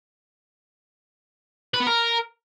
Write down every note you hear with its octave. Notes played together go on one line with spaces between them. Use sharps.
B4
B3
A#4